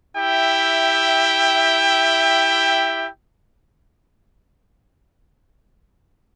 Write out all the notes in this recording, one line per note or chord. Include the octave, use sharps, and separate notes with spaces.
E4 G4 E5 G5